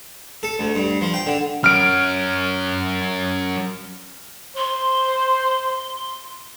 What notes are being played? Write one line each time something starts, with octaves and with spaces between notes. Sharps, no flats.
A4
D2
G2
F3
G5
D3
F#3 C#4 F6 D7
C5 C6